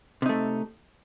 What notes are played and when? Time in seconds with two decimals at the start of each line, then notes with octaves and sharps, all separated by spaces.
0.22 C3
0.26 D#4
0.29 A3